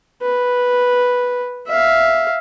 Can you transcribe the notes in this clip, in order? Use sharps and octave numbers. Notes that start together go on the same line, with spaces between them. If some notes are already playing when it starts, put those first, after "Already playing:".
B4
E5 F5